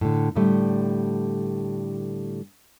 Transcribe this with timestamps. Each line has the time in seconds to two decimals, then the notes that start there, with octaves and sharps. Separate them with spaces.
0.01 A2 D3
0.35 A2 D3 G3 A3